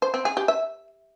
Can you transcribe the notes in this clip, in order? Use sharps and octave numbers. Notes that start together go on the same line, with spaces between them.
C5
C4
G#4
G4
E5